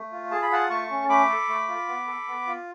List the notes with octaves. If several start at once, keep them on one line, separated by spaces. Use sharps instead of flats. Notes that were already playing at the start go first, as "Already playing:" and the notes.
Already playing: A3
F4
G#4 A5
B5
F4 F#5 A5
A3 A5 C#6
C#4
A3 B5 D6
A4
A3
F4
B3
A4
B3
F4